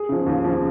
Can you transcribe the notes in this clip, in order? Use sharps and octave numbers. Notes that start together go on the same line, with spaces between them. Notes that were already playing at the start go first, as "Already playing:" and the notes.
Already playing: G#4
C#3 F3
D#2
C#3 F3